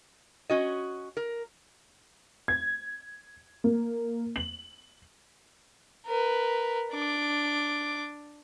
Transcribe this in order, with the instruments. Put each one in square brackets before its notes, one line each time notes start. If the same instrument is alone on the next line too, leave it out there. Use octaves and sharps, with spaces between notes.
[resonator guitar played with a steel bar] C#4 F#4 D#5
A#4
[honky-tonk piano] G#6
A#3
F#7
[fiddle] A#4 B4
D4 D6